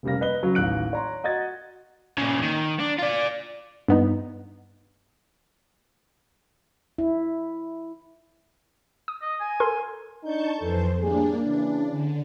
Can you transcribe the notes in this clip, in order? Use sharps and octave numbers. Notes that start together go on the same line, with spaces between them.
F1 C#3 G3 A#3 A#6
B4 D#5 G7
C#3 F#3
A1 D#2 F#6 D7
C#5 A#5 C6
F#4 D#5 F#5 G#6 A6
A#2 C#3
D#3
D4
F4 D5
G2 B3 D#4
E4
D#6
D#5
G#5
A4 A#4 C6
D4 D#4 A5 C#6 G6
F2 E3 A4 C5
A2 G3 A#3 D4 G#4
C#3 E3 D4
D3